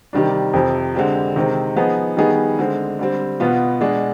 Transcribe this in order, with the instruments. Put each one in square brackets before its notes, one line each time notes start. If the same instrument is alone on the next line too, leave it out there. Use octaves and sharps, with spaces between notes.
[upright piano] C3 D#3 G3 D4
F2 C3 F3
D3 G#3 C4 G4
C3 D#3 G#3 C4
F3 B3 D#4 G#4
D#3 G3 B3 D#4 G#4
D3 G#3 C4
D3 G3 C4
B2 B3 F4
B2 G#3 D4 G#4